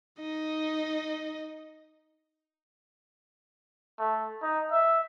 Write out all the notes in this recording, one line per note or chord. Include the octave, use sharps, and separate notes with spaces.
D#4 D#5
A3
D#4
E5